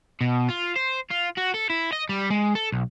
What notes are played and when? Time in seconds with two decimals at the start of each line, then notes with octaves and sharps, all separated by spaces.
0.21 B2
0.50 F4
0.76 C5
1.10 F4
1.37 F#4
1.54 A4
1.69 E4
1.92 D#5
2.09 G3
2.30 G#3
2.55 A4
2.72 B1